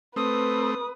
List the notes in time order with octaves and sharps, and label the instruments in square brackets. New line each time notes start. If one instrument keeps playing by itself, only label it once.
[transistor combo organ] A3 C4 [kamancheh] B4 [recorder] D#6